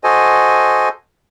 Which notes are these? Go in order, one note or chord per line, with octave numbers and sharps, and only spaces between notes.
F#4 A4 C5 D#5 G#5